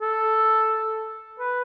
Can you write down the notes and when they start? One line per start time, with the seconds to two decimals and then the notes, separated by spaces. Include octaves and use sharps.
0.01 A4
1.39 B4